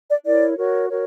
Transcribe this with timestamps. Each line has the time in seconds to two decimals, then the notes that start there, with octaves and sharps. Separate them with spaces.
0.09 D5
0.25 E4 A#4 C#5 D5
0.57 F#4 A#4 C#5
0.90 F#4 A#4 C#5